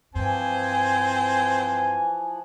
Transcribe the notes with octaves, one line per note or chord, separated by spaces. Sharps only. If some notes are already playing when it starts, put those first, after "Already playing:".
G2 E3 F3 C4 G#5